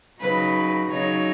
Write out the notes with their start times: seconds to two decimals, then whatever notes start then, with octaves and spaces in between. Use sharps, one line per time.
0.20 C#3 F#3 D#4 B4
0.89 C#3 F#3 D#4 C#5